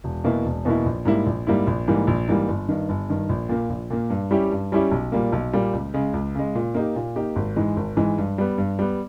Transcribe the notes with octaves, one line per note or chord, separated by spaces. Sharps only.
E1
E2 B2 A#3 E4
E1
E2 B2 A#3 E4
A#1
G#2 G3 A#3 E4
A#1
G#2 G3 A#3 E4
A#1
G#2 E3 G3 A#3
A#1
G#2 E3 G3 A#3
G1
G2 D#3
G1
G2 D#3
A#1
A#2 A#3
A#1
A#2 A#3
G2
G3 C#4 E4 G4
G2
G3 C#4 E4 G4
B1
A#2 G3 A#3
B1
A#2 G3 A#3
C#2
C#3 G#3
C#2
C#3 G#3
A#2
A#3 D#4 G4
A#2
A#3 D#4 G4
G#1
G#2 E3 G#3
G#1
G#2 E3 G#3
G2
G3 B3
G2
G3 B3